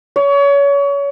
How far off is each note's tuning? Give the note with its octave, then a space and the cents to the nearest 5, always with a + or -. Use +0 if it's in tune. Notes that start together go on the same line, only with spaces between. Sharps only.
C#5 +30